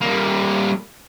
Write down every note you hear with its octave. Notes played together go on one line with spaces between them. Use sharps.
G3 A#3